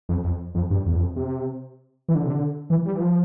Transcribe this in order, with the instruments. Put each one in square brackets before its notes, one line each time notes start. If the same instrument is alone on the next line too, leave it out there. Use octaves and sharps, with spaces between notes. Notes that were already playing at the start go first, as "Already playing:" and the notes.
[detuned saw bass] F2
F2
F2
G2
E2
F2
C3
E3
D3
C3
D3
E3
G3
E3
F3